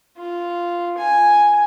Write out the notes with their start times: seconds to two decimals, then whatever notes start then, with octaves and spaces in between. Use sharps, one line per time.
0.18 F4
0.98 G#5